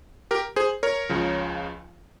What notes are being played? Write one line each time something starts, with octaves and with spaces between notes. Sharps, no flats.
G4 A#4
G#4 C5
A#4 C#5
C#2 C#3 F3